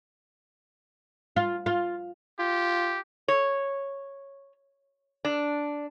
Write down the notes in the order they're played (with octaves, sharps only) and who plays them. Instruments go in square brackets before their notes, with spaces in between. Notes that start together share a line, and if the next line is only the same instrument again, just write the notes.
[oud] F4
F4
[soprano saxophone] F4 [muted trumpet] G4
[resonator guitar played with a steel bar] C#5
D4